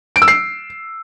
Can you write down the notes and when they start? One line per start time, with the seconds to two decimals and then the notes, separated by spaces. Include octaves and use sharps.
0.16 D7
0.22 E6
0.28 C7